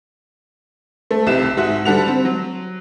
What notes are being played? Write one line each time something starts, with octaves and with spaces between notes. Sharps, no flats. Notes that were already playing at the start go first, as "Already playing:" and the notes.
A3
B1 C3 E4 G4 E7
G#2 F#4 E5
D3 G3 A4 F#5 F7
C4
F#3